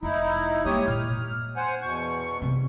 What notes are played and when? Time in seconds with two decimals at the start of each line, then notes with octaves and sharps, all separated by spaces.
0.03 F1 D#4 E4
0.65 G#3 A#3 G4 C#5 D#6
0.88 A#2 F6
1.56 C5 F#5 G#5
1.82 E2 B2 C#6
2.42 C3 C4